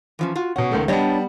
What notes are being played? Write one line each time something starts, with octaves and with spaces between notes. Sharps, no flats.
E3 F3 C#4
F4 F#4
B2 C#4 F#5
C#2 D#3 A3
G3 B3 D4 C#5 D#5